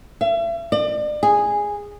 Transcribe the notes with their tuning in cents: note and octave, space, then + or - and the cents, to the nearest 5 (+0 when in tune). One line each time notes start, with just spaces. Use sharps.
E5 +40
D5 +35
G#4 -10